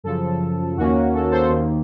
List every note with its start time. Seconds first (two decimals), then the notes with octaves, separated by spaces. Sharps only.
0.04 F#2 C#3 F3 A4
0.77 D#2 D#3 A#3 C#4 F#4
1.14 A4
1.31 A4 C5
1.49 D#2 D#3 A#3